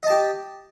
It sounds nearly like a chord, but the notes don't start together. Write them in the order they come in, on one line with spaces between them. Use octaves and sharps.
D#5 A5 G4